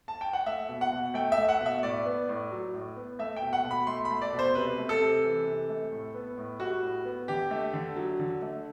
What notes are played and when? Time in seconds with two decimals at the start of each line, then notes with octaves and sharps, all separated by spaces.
0.08 A5
0.21 G5
0.33 F#5
0.46 A3 E5
0.69 B2
0.81 F#5
0.92 B2
1.14 A3 G5
1.32 E5
1.38 A3
1.49 F#5
1.61 B2
1.66 E5
1.83 A2 D5
2.05 B3
2.29 A2
2.52 F#3
2.74 A2
2.96 B3
3.19 A3 E5
3.36 G5
3.42 B2
3.53 F#5
3.64 B2
3.71 B5
3.87 A3 C6
4.05 B5
4.11 A3
4.22 D5
4.33 B2
4.39 C5
4.55 C3 B4
4.78 A3
4.89 A4
5.01 C3
5.24 E3
5.47 C3
5.69 A3
5.92 A2
6.14 B3
6.37 A2
6.60 G3 F#4
6.83 A2
7.05 B3
7.28 D3 G4
7.51 A3
7.73 D3
7.96 F#3
8.20 D3
8.42 A3